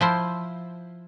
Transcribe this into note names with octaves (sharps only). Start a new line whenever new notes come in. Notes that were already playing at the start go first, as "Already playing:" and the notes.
F3 E4 C5